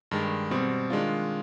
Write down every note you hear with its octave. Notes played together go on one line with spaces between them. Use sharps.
G2 D#3 G#3
B2 G3 C4
D#3 G#3 D4 F4